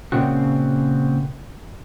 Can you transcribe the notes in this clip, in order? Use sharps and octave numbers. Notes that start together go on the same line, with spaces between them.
A#2 C#3 C4 F#4